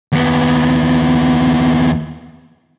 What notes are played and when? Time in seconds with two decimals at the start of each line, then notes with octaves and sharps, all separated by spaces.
0.12 D#2 B3